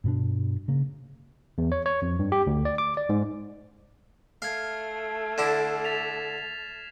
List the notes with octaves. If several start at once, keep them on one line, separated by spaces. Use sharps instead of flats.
G2 B2 D4
C#3 A#3
E2
C#5
C#5
F2
G2
G4
D2
D5
D6
D5
G#2
A3 F5 F6 G#6 C7
D3 D4 E4 E7
A6 B6 F7